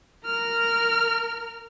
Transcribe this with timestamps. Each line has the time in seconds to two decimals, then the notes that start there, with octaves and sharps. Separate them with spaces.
0.25 A#4 F6